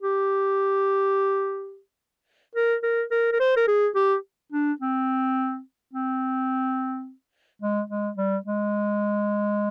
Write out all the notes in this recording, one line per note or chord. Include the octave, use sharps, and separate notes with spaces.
G4
A#4
A#4
A#4
A#4
C5
A#4
G#4
G4
D4
C4
C4
G#3
G#3
G3
G#3